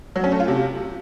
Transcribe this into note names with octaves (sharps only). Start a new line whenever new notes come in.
F#3
C#4
A3
F4
C3